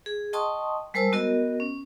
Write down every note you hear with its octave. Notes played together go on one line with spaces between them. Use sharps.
G#4
D#5 G5 A5 C6 C#6 D#6
G3 G#3 A#4 C5 A5 E6
B3 F#4 A#4 D#5
C#4